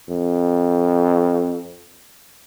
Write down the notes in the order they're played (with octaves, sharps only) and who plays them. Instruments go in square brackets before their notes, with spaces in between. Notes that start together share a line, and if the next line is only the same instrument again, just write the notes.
[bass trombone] F2